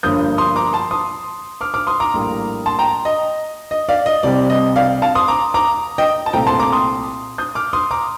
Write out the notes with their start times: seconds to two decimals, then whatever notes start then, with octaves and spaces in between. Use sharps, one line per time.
0.03 G1 G2 F3 A#3 D#6 G6
0.38 C6 D#6
0.56 A#5 D6
0.73 A5 C6
0.91 C6 D#6
1.61 D6 F6
1.74 D6 F6
1.87 C6 D#6
2.00 A#5 D6
2.13 A#1 A2 G3 A#3
2.66 A5 C6
2.79 G5 A#5
3.05 D#5
3.71 D#5
3.89 D5 F5
4.06 D#5
4.23 C2 C3 G3 C4 D5
4.50 D#5
4.76 D5 F5
5.02 F5 A5
5.15 C6 D#6
5.28 A#5 D6
5.54 A#5 D6
5.98 D#5 G5
6.26 A5
6.33 C2 A#2 A3 C4 G5 A#5
6.47 A5 C6
6.60 A#5 D6
6.72 C6 D#6
7.38 D#6 G6
7.55 D6 F6
7.73 C6 D#6
7.91 A#5 D6